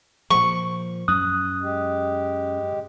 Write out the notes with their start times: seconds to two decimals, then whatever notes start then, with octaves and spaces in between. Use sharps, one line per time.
0.30 A#2 F3 C#6
1.08 F#2 D#6 F#6
1.62 G#3 G4